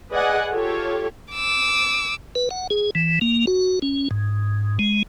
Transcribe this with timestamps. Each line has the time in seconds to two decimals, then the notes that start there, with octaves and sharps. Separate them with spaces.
0.12 G#4 B4 D5 D#5 F#5 G#5
0.51 F4 G4 A4 C#5
1.33 D6 E6
2.35 B4
2.51 F#5
2.70 G#4
2.95 E3
3.21 A#3
3.47 F#4
3.82 C#4
4.11 G#2
4.79 G#3